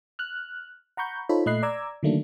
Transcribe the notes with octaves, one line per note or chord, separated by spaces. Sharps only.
F6 F#6
F#5 A#5 B5 C#6 G6
D#4 F4 A4 C5 C#5 B5
A#2 A3 D#5 B5 F#6 C7
D5 A#5 D6 E6 G#6
D3 D#3 F#3 A3 A#3 D4